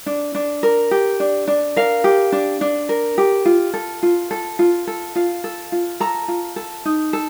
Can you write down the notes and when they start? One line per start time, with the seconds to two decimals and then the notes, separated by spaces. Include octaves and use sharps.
0.06 D4
0.35 D4
0.63 A#4
0.91 G4
1.20 D4
1.48 D4
1.76 A#4 F5
2.04 G4
2.32 D4
2.61 D4
2.89 A#4
3.18 G4
3.45 F4
3.74 A4
4.03 F4
4.31 A4
4.59 F4
4.87 A4
5.15 F4 F5
5.44 A4
5.72 F4
6.00 A4 A#5
6.28 F4
6.56 A4
6.85 D#4
7.13 A4